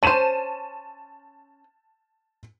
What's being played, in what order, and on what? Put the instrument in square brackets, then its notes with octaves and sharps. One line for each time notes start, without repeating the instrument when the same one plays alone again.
[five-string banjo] C#4 C5 [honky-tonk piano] A5 D#7 E7